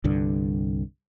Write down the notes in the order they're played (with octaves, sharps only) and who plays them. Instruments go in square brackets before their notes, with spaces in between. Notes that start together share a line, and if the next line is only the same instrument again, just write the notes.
[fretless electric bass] C2 G2 D3